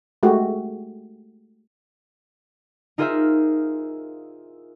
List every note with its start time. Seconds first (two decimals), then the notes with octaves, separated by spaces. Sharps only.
0.23 G#3 A3 F#4 G4
2.98 D#4 F4 G#4 A#4 C5 E5